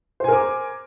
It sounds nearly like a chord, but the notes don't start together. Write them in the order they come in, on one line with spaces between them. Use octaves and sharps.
C5 G#5 A#4 D6